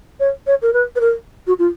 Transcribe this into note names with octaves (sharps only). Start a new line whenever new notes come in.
C#5
C#5
A#4
B4
B4
A#4
F#4
F4